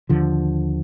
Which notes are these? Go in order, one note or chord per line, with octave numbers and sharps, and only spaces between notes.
D#2 D3 F3